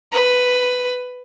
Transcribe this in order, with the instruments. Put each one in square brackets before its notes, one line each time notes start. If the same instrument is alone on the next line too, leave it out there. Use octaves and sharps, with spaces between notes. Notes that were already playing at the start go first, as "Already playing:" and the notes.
[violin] B4